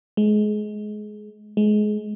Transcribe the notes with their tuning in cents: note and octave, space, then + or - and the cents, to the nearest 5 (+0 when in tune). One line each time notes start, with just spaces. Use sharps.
G#3 +25
G#3 +25